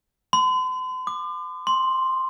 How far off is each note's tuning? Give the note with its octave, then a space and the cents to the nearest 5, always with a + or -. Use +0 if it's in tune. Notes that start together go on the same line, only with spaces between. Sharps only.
C6 -45
D6 +40
C6 +0